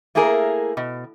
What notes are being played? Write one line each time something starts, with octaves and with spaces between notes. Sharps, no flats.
A3 A#3 E4 G#4 A#4
B2